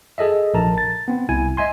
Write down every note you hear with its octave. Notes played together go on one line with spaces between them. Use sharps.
G#4 A4 D#5 E5
A#1 A#4 A5 A#5
A6
B3 C4
C2 E4 G#5
D#5 E5 G#5 C6